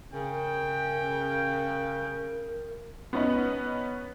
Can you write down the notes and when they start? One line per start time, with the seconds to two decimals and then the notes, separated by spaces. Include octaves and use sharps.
0.13 C#3 A#4 G5
3.13 B3 C#4 D#4 B4